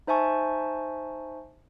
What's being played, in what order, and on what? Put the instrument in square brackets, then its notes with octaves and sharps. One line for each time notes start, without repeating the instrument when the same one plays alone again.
[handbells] D#4 C5 E5 G#5 A5 C#6